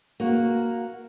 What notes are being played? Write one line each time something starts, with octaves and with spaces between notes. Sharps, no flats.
A#3 F#4